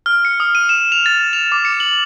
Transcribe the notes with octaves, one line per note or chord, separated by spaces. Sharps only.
F6
C#7
D#6
D#7
E7
F7
A6
F7
D6
C#7
F#7